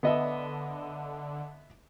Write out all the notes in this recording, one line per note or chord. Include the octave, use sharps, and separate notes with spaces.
D3 B3 D#5 E5